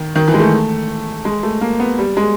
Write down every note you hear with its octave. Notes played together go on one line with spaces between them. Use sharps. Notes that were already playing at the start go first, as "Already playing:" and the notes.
Already playing: D#3
D#3
E3
G#3
A3
G#3
A3
A#3
B3
G3
G#3